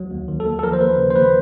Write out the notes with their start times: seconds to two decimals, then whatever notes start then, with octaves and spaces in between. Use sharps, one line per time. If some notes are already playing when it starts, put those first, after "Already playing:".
Already playing: C#2 F#3
0.11 D#2
0.28 D#3
0.40 A4
0.46 D#2
0.59 A4
0.63 F3 A#4
0.73 C5
0.81 D#2 B4
0.98 C#3
1.10 C5
1.16 D#2 B4